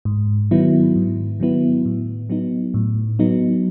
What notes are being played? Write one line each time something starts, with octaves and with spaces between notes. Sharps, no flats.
G#2
D#3 F#3 B3 E4
G#2
D#3 F#3 B3 E4
A2
F#3 B3 D#4
A2
F#3 B3 D#4